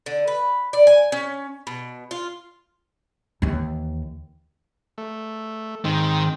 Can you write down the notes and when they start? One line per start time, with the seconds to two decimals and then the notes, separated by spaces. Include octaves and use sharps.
0.06 D3
0.28 B4
0.73 D5
0.87 G#5
1.12 C#4
1.67 B2
2.11 F4
3.42 D#2 E3
4.98 A3
5.85 G#2 D#3 C4